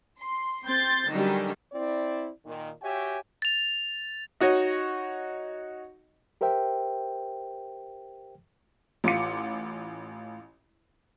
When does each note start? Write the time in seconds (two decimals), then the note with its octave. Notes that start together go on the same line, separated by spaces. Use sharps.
0.19 C6
0.64 C4 C6 G6 A6
1.10 D3 D#3 F#3 G3 C#4
1.73 C4 E4 D5
2.45 A#2 D#3
2.82 F#4 G4 C#5 E5 G5 G#5
3.42 A6 F7
4.40 D#4 F#4 C#5 D#5
6.41 G4 A#4 C5 E5 G5
9.04 A1 F4 D6 C#7